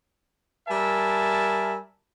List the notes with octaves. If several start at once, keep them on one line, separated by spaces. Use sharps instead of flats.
G3 A#4 E5 G#5 A5